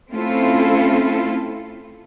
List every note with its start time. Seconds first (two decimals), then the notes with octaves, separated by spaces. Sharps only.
0.11 A3 C4 C#4 E4 F4 A4